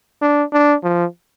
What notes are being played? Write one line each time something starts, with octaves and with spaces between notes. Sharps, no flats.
D4
D4
F3